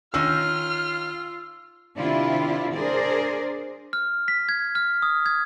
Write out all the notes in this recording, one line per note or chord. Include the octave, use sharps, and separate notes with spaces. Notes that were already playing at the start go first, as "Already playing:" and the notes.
D#3 C#4 F4 E6 F6
C3 D#3 D4 E4 F4
D4 G#4 A#4 C5 D5
F6
B6
G#6
F6
D#6
G#6